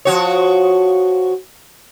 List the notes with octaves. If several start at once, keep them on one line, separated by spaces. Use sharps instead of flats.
F3 F#4 C#5